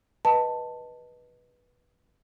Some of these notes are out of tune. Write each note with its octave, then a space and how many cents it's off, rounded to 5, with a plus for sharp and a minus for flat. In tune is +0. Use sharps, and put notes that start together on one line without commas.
B4 -15 D#5 +0 A5 +10